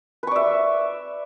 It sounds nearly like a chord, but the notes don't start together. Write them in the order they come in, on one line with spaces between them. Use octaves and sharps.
B4 C#6 D5 E5